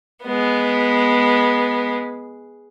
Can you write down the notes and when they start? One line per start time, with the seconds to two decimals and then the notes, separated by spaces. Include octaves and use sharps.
0.24 G#3 B3